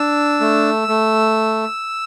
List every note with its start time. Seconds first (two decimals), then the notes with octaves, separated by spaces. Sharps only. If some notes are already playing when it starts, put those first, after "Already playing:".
Already playing: D4 E6
0.41 A3
0.88 A3